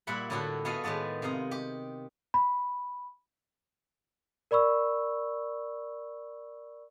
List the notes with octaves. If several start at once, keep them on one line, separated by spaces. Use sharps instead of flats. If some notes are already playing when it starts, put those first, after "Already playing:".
A#2 G3 E4 F#5 B5
A2 D3 E4 F#4 A4 G5
B3 F#4 G#4 A4 D#5 F5
A2 D#3 G#3 B3 D5
C3 D#5 F5 A#5
G4
B5
A#4 D5 B5 C#6 E6